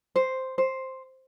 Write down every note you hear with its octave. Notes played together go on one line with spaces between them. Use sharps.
C5
C5